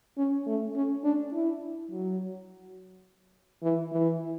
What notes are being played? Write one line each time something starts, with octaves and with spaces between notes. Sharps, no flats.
C#4
A3
C#4
D4
E4
F#3
E3
E3